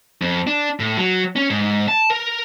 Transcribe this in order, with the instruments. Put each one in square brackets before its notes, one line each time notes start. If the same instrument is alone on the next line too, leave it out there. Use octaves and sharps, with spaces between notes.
[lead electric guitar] F2
D4
A2
F#3
C#4
G#2
A5
A#4